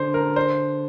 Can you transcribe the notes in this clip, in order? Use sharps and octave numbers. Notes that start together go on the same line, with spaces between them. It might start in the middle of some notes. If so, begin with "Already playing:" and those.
Already playing: D3 C5
A#4
C5